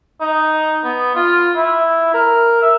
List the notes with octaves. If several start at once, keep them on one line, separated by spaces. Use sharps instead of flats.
D#4
B3
F4
E4
A#4
E5